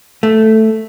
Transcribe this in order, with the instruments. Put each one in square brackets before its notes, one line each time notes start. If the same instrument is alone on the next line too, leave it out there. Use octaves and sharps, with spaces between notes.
[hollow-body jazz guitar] A3